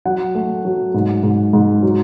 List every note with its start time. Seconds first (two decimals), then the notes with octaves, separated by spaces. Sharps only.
0.05 F#3 F#5
0.35 A3
0.65 F#3
0.94 G#2
1.23 G#2
1.53 G#2
1.83 F#3